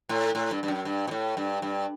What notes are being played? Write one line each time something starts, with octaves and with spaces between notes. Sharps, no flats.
A2
A2
G2
G2
F#2
G2
B2
A2
G2
G2